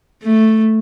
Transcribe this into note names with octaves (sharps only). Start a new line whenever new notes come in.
A3